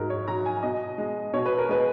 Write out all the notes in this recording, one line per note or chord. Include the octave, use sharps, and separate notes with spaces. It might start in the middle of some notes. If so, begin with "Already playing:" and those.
Already playing: G#2 F#3 A#4
C#5
F#3 A#5
G#5
B2 D#5
G#3
B2 C#5
B4
A#4
G#3 B4